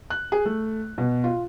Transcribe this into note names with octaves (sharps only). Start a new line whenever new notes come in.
F#6
G#4
A3
B2
F4